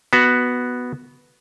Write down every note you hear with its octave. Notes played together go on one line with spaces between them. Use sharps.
B3 F#4